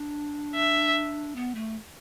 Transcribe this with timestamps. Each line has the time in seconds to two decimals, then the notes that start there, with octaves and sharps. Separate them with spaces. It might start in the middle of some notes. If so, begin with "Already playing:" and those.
Already playing: D4
0.55 E5
1.36 B3
1.55 A3